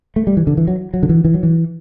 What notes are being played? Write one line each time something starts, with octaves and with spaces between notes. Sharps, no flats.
A3
G3
E3
D3
E3
F#3
F#3
D3
E3
E3
F#3
E3